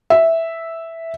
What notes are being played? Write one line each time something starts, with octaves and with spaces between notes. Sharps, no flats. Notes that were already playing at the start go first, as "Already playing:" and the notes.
E5